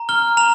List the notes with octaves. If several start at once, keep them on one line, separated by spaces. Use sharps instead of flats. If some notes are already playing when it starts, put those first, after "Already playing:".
Already playing: A#5
F6 G7
A#5 F7